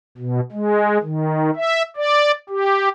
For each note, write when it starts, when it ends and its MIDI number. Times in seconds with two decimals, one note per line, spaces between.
0.18 0.40 47
0.52 0.98 56
1.03 1.50 51
1.56 1.82 76
1.96 2.31 74
2.49 2.89 67